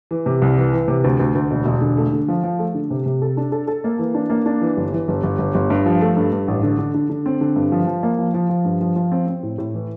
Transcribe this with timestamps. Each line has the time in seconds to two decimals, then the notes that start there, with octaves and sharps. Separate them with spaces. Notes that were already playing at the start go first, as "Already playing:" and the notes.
0.11 E3
0.26 C3
0.42 C2
0.57 E3
0.73 E3
0.88 C3
1.04 D2
1.20 D2
1.35 D2
1.51 E1
1.66 E1
1.81 D3
1.97 A3
2.12 D3
2.28 F3
2.43 F3
2.59 A3
2.75 D3
2.91 C3
3.06 C3
3.22 A4
3.37 D4
3.52 A4
3.67 A4
3.84 A#3
3.99 E3
4.15 D4
4.30 A#3
4.46 D4
4.61 E3
4.77 G1
4.92 E3
5.08 G1
5.23 G1
5.38 G1
5.55 G1
5.70 G2
5.86 F3
6.01 A3
6.17 G2
6.32 G2
6.48 A1
6.63 D3
6.79 D3
6.94 D3
7.10 D3
7.26 C4
7.41 D3
7.56 G2
7.72 F3
7.87 F3
8.03 A#3
8.19 F3
8.34 F3
8.49 F3
8.65 G2
8.81 F3
8.96 F3
9.12 C4
9.27 C4
9.43 A2
9.58 A2
9.74 E3